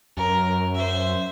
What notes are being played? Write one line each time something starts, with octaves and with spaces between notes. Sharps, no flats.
F#2 A#4
C5 E5